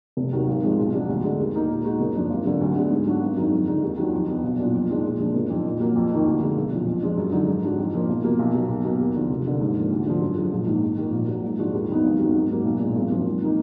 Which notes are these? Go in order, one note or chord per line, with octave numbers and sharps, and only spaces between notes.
F1
D#2 D#3 F#3
G#1
G#2 F3 G#3
B1
B2 F#3 D4
D2
D3 G#3
D#2
D#3 A#3 D#4
A#2
G#3 D#4 F#4
F#1
F#2 F3 A#3 D4
G#1
F#2 D3 F#3
D2
D3 G#3 B3
G#2
F#3 D4 F#4
G#1
F#2 D#3 G#3 D#4
F2
D3 G#3 D#4
D#2
D#3 F#3 D4 F4
F2
F3 B3
B1
A#2 F#3 D4 F4
F2
D#3 G#3 D4 F4
A#2
F3 G#3 D4
F#1
F2 D#3
A#2
F#3 A#3
F2
D#3 A#3 D#4
D2
D3 G#3
B1
A#2 F3
F2
F3 G#3 D4
F#2
D3 G#3 D#4 F#4
G#2
F#3 D4 F4
F2
F3 A#3
B1
B2 F#3 A#3 F4
B1
B2 A#3
B1
B2 A#3
D#2
D3 F3
F1
D#2 D3
G#2
F3 A#3
D2
D3 F3
F#2
F3 G#3
A#1
G#2 D#3 A#3
F2
D#3 A#3
A#1
A#2 F#3
G#2
F3 G#3 D4 F#4
D#2
D#3 F#3 B3 D#4
G#1
F#2 D#3 F#3
G#2
F#3 A#3 D#4
B1
A#2 G#3 D4
G#1
F#2 F3 A#3
G#1
D#3 A#3 D#4